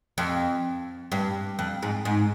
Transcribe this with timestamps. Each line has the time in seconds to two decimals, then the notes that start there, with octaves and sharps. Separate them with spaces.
0.18 F2
1.12 G2
1.59 F2
1.83 G#2
2.05 G#2